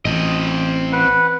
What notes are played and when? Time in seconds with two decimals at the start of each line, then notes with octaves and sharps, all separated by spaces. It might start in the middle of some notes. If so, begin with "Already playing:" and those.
0.05 A1 C4 D#5
0.93 B4 F#5